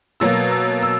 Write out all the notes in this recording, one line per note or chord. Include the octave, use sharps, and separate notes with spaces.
B2 F#3 A#3 E6
E6
E6